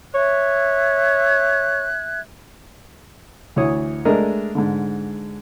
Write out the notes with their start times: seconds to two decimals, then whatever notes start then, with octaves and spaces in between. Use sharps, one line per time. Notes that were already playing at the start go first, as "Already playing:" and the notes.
0.15 C#5 E5 F#6 G#6
3.56 D2 E3 C#5 D#6
4.05 G#3 A3 D4 A#4 D#5
4.55 G#2 D3